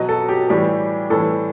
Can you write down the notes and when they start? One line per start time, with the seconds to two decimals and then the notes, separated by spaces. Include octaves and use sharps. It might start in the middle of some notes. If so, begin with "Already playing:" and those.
Already playing: B2 F#3 D#5
0.09 A4
0.29 G4
0.49 A2 E3 G3 G4
1.10 A2 E3 G3 A4